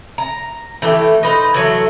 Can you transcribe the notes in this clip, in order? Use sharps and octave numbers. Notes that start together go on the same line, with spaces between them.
A#5
E3 A3 G4
D#4 B4 C5
E3 F#3 A3